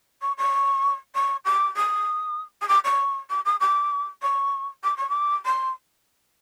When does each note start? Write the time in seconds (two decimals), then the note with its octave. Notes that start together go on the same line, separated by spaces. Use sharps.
0.22 C#6
0.37 C#6
1.15 C#6
1.45 D6
1.76 D#6
2.61 D#6
2.68 D6
2.84 C#6
3.30 D6
3.45 D#6
3.60 D6
4.22 C#6
4.84 D6
4.97 C#6
5.09 D6
5.45 C6